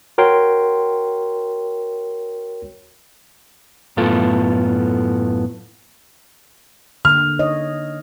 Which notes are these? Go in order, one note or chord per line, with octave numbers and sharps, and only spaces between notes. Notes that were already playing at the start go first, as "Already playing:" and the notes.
F#4 A#4 C#5 G5 C6
F#2 A2 A3 B3 F4 A4
D3 A#3 F6
D#4 C#5 D#5